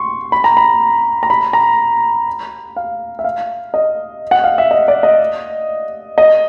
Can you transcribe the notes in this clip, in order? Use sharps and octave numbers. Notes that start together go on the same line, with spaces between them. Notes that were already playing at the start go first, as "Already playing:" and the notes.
Already playing: C6 C#6
B5
A#5
B5
A#5
B5
A#5
F5
E5
F5
D#5
F#5
F5
E5
D#5
D5
D#5
D#5